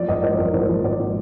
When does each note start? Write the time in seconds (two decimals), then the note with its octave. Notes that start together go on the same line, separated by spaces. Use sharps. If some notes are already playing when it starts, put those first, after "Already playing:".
Already playing: F3 D5
0.08 G#1 D#5
0.23 F3 D5
0.38 G#1 A#4
0.53 F3 C5
0.69 F3
0.84 G#1 D5